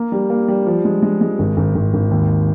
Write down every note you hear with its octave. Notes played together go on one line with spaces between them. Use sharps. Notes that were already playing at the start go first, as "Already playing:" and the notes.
Already playing: A#3
G3
A#3
G3
F3
G#3
G#3
G#3
G#1
G#1
G#1
G#1
D#2